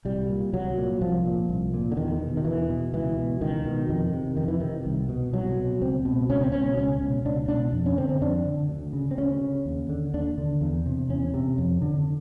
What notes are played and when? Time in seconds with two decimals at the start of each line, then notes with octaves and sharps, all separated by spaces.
0.05 C2 G3
0.30 A#2
0.53 C2 F#3
0.78 A#2
1.01 C2 F3
1.26 A#2
1.49 C2
1.74 A#2
1.92 D3
1.97 E2 D#3
2.21 B2
2.37 D#3
2.45 E2 E3
2.70 B2
2.93 C#2 E3
3.17 B2
3.41 C#2 D#3
3.65 B2
3.89 F2 D#3
4.13 C3
4.37 F2 D#3
4.48 E3
4.60 C3 D#3
4.86 C2
5.09 B2
5.33 C2 F#3
5.57 B2
5.81 C#2 C4
6.05 B2
6.29 C#2 C#4
6.41 C4
6.52 B2 C#4
6.77 C#2 C#4
7.02 B2
7.25 C#2 D4
7.48 B2 D4
7.73 F2
7.86 C#4
7.97 D3 C4
8.09 C4
8.21 F2 D4
8.45 D3
8.69 D2
8.93 C#3
9.11 C4
9.18 D2 C#4
9.41 C#3
9.65 D#2
9.89 D3
10.14 D#2 D4
10.38 D3
10.61 E2
10.86 C3
11.09 E2 C#4
11.34 C3
11.58 F2
11.82 D3